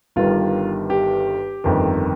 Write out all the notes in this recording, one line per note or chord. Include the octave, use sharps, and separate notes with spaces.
G1 G2 D#3 G3 F4
G4
G1 F2 D#3